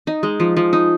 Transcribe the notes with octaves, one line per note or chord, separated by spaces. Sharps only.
D#4
G#3
F3
F3
D#4